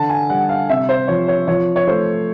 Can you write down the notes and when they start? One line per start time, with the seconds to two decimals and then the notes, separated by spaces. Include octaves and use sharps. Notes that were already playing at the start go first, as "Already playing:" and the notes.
Already playing: D3 A5
0.09 G#5
0.30 G3 F#5
0.49 F5
0.69 C3 E5
0.89 C5
1.08 F3 C#5
1.28 C#5
1.48 F3 C#5
1.76 C#5
1.87 A3 C5